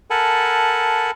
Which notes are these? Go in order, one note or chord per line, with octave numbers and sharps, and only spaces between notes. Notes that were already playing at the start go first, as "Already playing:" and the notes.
A4 A#4 F#5 G#5 A5 B5